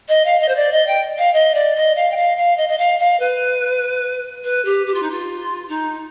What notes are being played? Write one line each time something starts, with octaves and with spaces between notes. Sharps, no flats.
D#5
F5
D#5
C5
D5
D#5
G5
F5
D#5
D5
D#5
F5
G5
F5
F5
D#5
D#5
F5
F5
B4
B4
G4
G4
F4
D#4
F4
D#4